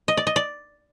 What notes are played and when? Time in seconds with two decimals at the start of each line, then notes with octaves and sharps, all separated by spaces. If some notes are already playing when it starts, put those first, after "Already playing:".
0.08 D#5
0.17 D5
0.27 D#5
0.36 D5